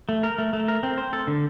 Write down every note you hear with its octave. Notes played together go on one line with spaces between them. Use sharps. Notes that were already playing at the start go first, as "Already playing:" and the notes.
A3
A#4
A3
A3
A#4
C4
C5
A4
D3